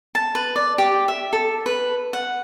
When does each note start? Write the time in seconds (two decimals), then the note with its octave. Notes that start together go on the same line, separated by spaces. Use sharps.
0.15 A5
0.35 B4
0.56 D5
0.78 G4
1.08 E5
1.33 A4
1.66 B4
2.13 F#5